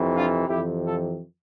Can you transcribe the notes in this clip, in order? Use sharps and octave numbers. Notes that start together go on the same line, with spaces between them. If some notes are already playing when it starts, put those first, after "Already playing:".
Already playing: F2 C3 E3
D4 F4
F2 C3 E3 E4 G4
F4 A4